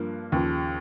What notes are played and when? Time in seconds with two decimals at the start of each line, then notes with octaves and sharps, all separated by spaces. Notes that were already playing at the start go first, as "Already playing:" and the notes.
Already playing: G2 F3 A#3
0.32 D#2 C#3 F3